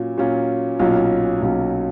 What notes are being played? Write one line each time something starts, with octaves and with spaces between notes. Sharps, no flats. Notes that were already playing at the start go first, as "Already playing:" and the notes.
Already playing: A#2 F#3 C#4 F4
A#2 F#3 C#4 F4
B1 A#2 F#3 C#4 F4
B1 A#2 F#3 C#4 F4